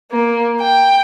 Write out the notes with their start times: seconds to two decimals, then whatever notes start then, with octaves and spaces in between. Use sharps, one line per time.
0.12 A#3
0.61 G5